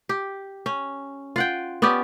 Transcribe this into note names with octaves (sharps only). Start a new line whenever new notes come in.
G4
C#4
F4 F#5 G5
B3 C#4 G4 D5